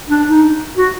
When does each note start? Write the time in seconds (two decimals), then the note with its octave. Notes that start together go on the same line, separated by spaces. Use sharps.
0.09 D4
0.29 D#4
0.77 F#4